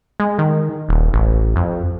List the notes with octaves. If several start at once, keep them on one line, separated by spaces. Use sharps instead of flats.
G#3
D#3
D#1
A1
F2